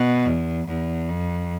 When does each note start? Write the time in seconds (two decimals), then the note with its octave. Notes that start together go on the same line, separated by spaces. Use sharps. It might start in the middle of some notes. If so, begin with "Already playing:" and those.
Already playing: B2
0.26 E2
0.68 E2
1.09 F2